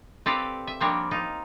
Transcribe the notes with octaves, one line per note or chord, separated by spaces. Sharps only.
C4 G4 A4 B4 D5 F5
E5
F3 G3 A#3 C4 D4 C#5
D#4 F4